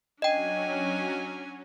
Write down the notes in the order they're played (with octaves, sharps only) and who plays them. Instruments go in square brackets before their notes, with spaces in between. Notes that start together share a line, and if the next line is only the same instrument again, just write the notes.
[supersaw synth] F#3 C#4 [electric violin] D4 G#5 [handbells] D#5 G5